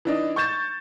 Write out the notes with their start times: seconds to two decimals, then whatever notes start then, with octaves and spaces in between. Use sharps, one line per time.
0.05 E3 D4 D#4
0.36 C#6 G6 A6 E7